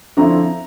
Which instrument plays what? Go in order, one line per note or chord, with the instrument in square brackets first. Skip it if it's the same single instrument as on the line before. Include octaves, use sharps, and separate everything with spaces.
[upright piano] D3 F3 C4 E4 A#5